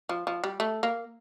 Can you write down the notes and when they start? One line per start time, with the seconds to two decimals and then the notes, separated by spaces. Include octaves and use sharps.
0.09 F3
0.27 F3
0.44 G3
0.60 A3
0.83 A#3